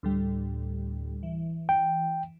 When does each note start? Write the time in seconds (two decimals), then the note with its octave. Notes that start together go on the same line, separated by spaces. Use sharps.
0.03 D2 A2 G3
1.23 E3
1.69 G5